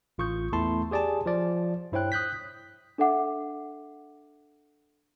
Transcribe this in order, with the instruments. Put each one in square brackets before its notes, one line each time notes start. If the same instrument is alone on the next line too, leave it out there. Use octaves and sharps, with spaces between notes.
[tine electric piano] A1 F4 C#6 D#6 G6
E2 A3 E4 A5 C6
G4 G#4 D5 G#5 A5
F3 D5
G2 E4 C5 C#5 G5 F#6
D#6 F#6 G6 B6
[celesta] D4 A4 E5 F#5 D6